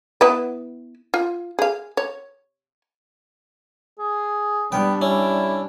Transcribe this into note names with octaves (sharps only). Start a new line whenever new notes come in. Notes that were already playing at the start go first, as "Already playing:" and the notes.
B3 E4 B4
F4
G#4 F5
C#5
G#4
G3 B3 D4 G5
C#4 E4